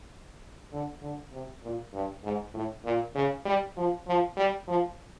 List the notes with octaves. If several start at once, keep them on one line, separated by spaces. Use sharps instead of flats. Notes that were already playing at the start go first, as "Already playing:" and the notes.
D3
D3
C3
A#2
G2
G#2
A2
A#2
C#3
G3
F3
F3
G3
F3